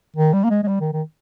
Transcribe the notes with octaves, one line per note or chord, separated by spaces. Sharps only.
D#3
G3
A#3
G#3
G#3
G3
D#3
D#3